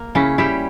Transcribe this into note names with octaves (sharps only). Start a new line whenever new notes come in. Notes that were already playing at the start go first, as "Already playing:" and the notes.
Already playing: A#3
C#3 C#4 E4
G3 E4 G4